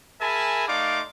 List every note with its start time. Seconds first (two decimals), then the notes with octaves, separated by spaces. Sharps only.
0.21 G#4 A#4 E5 G#5 A5 B5
0.68 A3 D#4 D5 F5 C6 D6